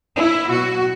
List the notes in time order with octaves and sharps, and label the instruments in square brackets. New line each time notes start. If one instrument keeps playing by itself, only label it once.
[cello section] E4
B2 F#3 F#4